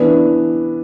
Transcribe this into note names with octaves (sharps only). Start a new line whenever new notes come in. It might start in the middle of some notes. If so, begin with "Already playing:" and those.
Already playing: E3 B3 D4